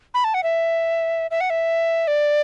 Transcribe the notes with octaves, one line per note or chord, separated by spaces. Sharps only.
B5
A5
F#5
E5
E5
F#5
E5
D5